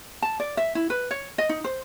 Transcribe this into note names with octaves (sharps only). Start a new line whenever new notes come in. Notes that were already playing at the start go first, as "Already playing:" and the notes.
A5
D5
E5
E4
B4
C#5
D#5
D#4
C5